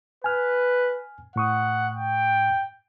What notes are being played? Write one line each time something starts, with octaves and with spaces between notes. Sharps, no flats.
B4 G#5 F6
A2 F#5 C#6 D#6
G5